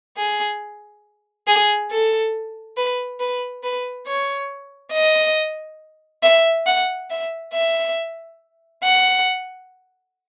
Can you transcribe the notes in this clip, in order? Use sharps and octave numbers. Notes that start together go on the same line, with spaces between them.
G#4
G#4
A4
B4
B4
B4
C#5
D#5
E5
F#5
E5
E5
F#5